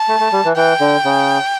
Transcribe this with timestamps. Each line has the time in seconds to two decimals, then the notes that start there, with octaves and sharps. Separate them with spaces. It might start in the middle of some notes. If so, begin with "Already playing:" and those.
Already playing: A5
0.08 A3
0.20 A3
0.32 G3
0.45 E3
0.56 E3 G5
0.80 D3
1.05 C#3